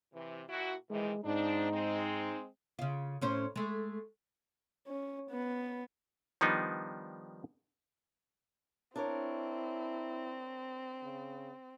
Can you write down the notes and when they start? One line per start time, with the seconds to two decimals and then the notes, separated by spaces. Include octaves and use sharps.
0.14 C3 E3
0.49 A#2 E4 F#4
0.90 C3 D#3 E3 G#3
1.25 G#2 F3 C4 D4 D#4
1.73 G#3 C4
2.79 C#3 F4
3.21 A2 C#4 C5
3.56 G#3 A3
4.87 C#4
5.31 B3
6.41 D#3 F3 G3 B3 D4 D#4
8.96 C4 D4 E4 A#4 C#5
11.02 C#3